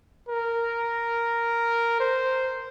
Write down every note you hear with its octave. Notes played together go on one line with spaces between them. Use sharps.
A#4
C5